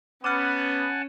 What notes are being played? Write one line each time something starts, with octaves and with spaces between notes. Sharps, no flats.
B3 C#4 F#5 G#5 A5 D6 F6